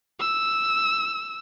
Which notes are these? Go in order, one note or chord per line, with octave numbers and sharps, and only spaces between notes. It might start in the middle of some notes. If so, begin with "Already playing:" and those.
E6